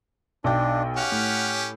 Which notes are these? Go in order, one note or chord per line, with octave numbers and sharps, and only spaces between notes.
B1 D4 G5
C#4 G4 F#5 F6
A2